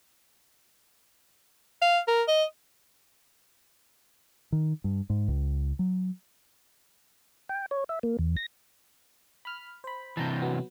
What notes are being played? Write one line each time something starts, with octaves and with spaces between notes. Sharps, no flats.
F5
A#4
D#5
D#3
G2
G#2
C#2
F#3
G5
C#5
E5
A#3
E2
A#6
B5 F6
C5 B5
C3 E3 A5 A#5 G6
F#3 B3